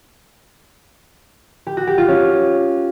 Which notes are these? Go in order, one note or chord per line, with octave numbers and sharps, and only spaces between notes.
G4
F#4
G4
F4
C#4